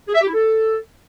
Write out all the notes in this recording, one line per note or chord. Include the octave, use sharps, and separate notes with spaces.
G#4
E5
G4
E4
A4